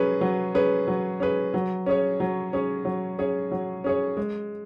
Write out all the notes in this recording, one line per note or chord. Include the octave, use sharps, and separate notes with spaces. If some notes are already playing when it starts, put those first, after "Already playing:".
Already playing: F#3 C#4 G#4 B4
F#3
C#4 G#4 B4
F#3
C#4 G#4 B4
F#3
C#4 G#4 C#5
F#3
C#4 G#4 C#5
F#3
C#4 G#4 C#5
F#3
C#4 G#4 C#5
G#3